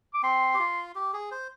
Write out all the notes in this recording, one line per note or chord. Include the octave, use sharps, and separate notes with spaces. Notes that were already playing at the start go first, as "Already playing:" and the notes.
D6
C4 C6
G4
F4
G4
G#4
C5